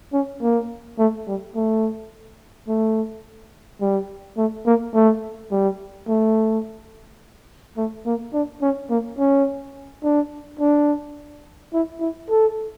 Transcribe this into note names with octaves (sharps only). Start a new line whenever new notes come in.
C#4
A#3
A3
G3
A3
A3
G3
A3
A#3
A3
G3
A3
A3
A#3
D4
C#4
A#3
C#4
D4
D4
E4
E4
A4